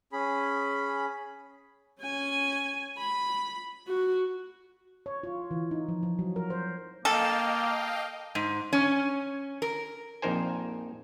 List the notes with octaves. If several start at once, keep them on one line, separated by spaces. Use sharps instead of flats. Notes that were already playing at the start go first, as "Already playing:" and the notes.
C#4 G#4 B5
C#4 G#5
B5
F#4
C#5
F4
E3
D#4
F3
F3
F#3
A#4
C5
A#3 A4 D#5 F5 G5
G#2
C#4
A#4
A#1 F2 D#4 A#4 C5 G#5